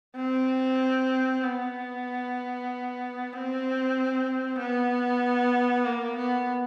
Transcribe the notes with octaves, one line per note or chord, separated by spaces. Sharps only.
C4
B3
C4
B3
A#3
B3